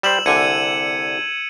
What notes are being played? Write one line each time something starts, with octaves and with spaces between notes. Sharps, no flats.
G3 G4 C5 E6 E7 F#7
C2 D3 G#5 G#6 C#7 D#7